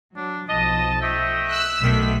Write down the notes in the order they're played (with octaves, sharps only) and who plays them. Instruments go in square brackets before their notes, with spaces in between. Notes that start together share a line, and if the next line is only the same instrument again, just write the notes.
[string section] F#3 [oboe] D4
[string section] B1 F3 [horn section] D#5 [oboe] A5
[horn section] A3 D#5 G5 [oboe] E5
[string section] E6 F#6
[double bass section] B1 B2 A3 [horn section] D3 D#3 [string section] B6